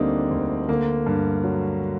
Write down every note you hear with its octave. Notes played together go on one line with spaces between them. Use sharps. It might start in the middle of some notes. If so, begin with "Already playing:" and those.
Already playing: D2 D3 G3 A#3 C4 D4 D#4
D2
D3 A#3
G2
F#3